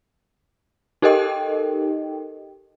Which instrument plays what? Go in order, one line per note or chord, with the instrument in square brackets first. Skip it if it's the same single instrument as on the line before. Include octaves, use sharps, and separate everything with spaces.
[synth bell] D#4 G4 A4 A#4 D#5 G5